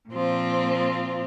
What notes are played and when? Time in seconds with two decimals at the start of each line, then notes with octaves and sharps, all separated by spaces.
0.10 A#2 F3 C4 F4